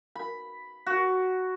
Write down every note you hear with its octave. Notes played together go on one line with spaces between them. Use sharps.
B5
F#4